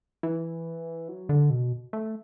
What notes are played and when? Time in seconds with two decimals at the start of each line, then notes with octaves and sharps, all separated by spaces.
0.23 E3
1.08 F#3
1.29 D3
1.50 B2
1.93 A3